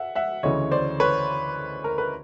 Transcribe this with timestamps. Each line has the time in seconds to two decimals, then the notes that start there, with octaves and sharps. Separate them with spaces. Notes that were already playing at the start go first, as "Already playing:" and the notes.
Already playing: E5 F#5
0.16 E5 F#5
0.43 D2 C#3 E3 C#5 D#5
0.71 C5 D5
1.00 B4 C#5
1.84 A#4
1.98 B4